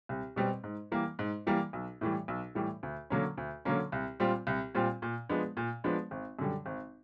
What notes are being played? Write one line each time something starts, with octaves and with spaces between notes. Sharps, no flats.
C2
B2 G3 C4
G#2
E3 G3 A#3
G#2
E3 G3 A#3
B1
A2 E3 G3
B1
A2 E3 G3
D2
D3 F#3 A#3 C#4
D2
D3 F#3 A#3 C#4
C2
A#2 G3 C4 F4
C2
A#2 G3 C4 F4
A#2
F3 G#3 B3 D4
A#2
F3 G#3 B3 D4
G#1
F#2 D3 G3
G#1